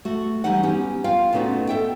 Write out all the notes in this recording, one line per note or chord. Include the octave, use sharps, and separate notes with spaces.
A3 F#4
E3 G3 C#4 D#4 F#5
B3 C#4 G4 F#5
F4 F5 G5
A#2 A3 B3 C#4 D#4 F#4
A4 E5 G5